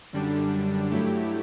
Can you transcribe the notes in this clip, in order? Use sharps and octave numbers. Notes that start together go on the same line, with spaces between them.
F#2 D3 G3 D4
G2 F#3 A3 E4 G4